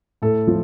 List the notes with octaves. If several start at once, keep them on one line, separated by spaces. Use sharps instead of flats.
A2 A4
F3